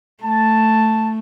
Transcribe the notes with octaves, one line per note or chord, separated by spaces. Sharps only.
A3 A5